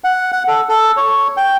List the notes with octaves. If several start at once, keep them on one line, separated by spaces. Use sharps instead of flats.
F#5
F#5
A4
A4
C#5
G5